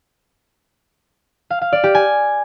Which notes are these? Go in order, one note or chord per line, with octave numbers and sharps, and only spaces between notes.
F5
F5
D5
G4
G#5